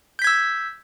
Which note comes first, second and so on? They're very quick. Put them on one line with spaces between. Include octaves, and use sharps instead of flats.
G6 B6 G#6 E6